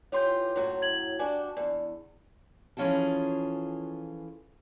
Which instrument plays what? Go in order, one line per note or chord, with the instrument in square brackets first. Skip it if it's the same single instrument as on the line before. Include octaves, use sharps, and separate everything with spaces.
[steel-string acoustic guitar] E3 F4 G4 [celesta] C#5 C6 G6
[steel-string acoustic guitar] F#2 A2 F#3
[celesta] G#6 F#7
[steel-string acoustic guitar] D4 F#4 G4 [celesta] G#5
[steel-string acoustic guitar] E2 [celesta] D5
[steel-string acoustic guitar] E3 F3 C#4 F4 G#4 A4